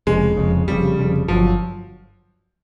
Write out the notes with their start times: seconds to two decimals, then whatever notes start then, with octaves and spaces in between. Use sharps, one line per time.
0.07 F1 F2 C#3 G#3
0.37 F1 F2 C#3
0.68 F1 F2 C#3 G3
0.98 F1 F2 C#3
1.28 G1 D3 F3 F#3